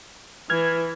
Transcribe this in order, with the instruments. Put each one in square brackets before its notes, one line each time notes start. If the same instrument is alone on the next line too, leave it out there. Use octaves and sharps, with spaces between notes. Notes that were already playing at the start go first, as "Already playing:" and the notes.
[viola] E3 [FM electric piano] F6 G#6